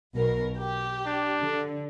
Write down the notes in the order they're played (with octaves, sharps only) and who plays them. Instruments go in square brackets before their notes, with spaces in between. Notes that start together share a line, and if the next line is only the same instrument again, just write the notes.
[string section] B1 B2 A#4
G4
[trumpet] D4
[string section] D3